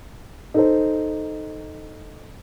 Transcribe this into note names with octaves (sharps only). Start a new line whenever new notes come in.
D#4 A4 C5